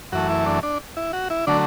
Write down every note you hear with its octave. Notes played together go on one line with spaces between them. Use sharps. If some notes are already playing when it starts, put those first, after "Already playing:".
F#2 E3 A3 F#4
E4
D4
D4
E4
F#4
E4
D3 F#3 A3 D4